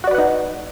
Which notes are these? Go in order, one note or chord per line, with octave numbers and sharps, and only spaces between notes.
D#4 F#4 B4 D5 F#5